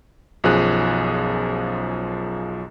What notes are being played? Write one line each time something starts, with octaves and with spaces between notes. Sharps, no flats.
B1 F#2 F3 G#4 F#6